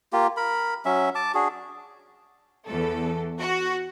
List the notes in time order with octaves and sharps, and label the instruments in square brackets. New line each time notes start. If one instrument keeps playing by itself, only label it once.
[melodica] A#3 F4 G4
A#4 B5
F#3 C#4 E5
A5 D6
D4 F#4 G#4
[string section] E2 A4
F#4